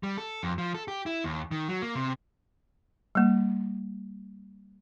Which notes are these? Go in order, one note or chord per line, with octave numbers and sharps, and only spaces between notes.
G3
A4
F2
F3
A4
G4
E4
D#2
D#3
F#3
A#3
C3
G3 A#3